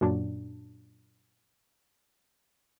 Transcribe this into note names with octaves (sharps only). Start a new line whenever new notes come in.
F#2 A#2 F#3 D4